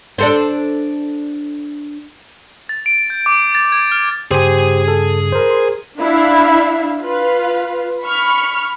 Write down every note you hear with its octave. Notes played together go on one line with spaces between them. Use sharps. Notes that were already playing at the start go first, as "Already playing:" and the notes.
D4 A4 C5
A6
D7
G6
D6
A6
G#6
F6
G2 C#3 G4 G#4 C5 G#5
A4
A#4 C5
C6
D4 E4 E5 F5
F4 B4 F5
B5 C#6 F6